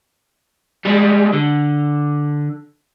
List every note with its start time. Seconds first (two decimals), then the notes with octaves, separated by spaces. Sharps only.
0.85 G3 G#3
1.33 D3